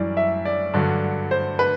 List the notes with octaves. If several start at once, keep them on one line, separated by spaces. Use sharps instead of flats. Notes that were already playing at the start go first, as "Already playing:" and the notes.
Already playing: F#2 E3 G3 D5
E5
D5
G2 D3 F#3
C5
B4